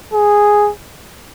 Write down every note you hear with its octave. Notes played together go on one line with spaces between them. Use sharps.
G#4